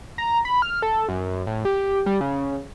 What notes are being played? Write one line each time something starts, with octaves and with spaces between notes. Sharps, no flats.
A#5
B5
F6
A4
F#2
A2
G4
G3
C#3